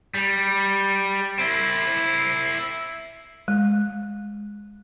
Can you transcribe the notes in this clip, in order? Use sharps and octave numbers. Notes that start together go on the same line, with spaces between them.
G3
C4 E4
G#3